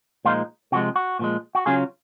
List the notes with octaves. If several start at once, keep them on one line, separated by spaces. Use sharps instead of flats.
A#2 F3 G#3 D#4 F4
C3 F3 G#3 F#4
F#4
A#2 F3 G#3
F#4
C#3 F#3 C#4 F4 G#4